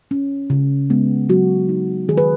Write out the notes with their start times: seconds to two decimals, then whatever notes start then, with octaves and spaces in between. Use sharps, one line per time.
0.11 C#4
0.50 C#3
0.90 G#3 B3
1.29 F#3 F#4
1.69 D#4
2.09 D#3 G#4
2.18 B4